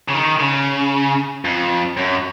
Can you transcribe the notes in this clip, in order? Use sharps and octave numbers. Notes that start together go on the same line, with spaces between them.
C#3
D#3
C#3
F2
F#2